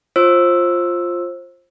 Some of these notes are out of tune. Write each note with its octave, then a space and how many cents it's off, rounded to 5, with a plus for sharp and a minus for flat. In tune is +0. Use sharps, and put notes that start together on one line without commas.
F4 +0 C5 +25 E6 +0